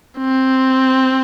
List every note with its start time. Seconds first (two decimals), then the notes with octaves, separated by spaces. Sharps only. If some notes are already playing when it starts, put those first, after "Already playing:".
0.19 C4